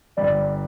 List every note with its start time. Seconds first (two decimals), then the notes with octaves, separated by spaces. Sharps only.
0.17 G1 G2 G3 D5